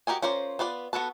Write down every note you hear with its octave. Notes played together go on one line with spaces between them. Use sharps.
F#4 G4 A#4 D#5 G#5
C#4 F4 A#4 C5 D5
B3 F4 B4 D5
B3 F#4 A4 B4 A5